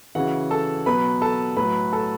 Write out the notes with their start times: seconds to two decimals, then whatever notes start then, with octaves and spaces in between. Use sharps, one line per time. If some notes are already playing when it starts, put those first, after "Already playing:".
0.15 C#3 E3 F#4 F#5
0.51 A4 A5
0.86 B2 F#3 B4 B5
1.22 A4 A5
1.57 A2 F#3 B4 B5
1.93 A4 A5